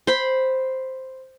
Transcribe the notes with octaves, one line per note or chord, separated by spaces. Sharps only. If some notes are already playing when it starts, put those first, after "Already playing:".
C5 B5